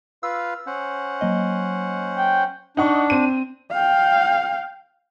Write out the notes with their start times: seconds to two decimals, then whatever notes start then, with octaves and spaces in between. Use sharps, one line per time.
0.23 F4 B4 F5 E6
0.67 C#4 C5 F#5
1.21 F#3 A#3 D#5
2.17 G5
2.77 D4 D#4 F#5 C#6
3.10 C4 D#7
3.71 F5 G5